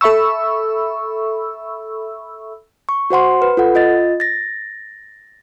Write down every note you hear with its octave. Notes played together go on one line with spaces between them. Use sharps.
A4 E5 B5 C#6 E6
C#6
F#4 C5 F#5 C6
B4
F4 A4 F#5
F4 D#5 A6
A6 A#6